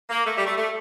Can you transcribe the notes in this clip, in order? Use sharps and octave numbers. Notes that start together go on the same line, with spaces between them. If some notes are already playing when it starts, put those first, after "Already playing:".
A#3
A3
G3
A3
A3